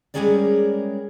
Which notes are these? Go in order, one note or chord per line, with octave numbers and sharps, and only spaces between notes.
G3 G#3 C#4 G#4 A#4 D5